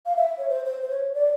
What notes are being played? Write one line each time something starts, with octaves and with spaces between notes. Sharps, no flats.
F5
E5
C#5
C5
C5
C5
C#5
D5